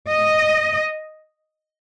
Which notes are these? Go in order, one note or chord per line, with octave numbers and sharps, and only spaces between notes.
D#5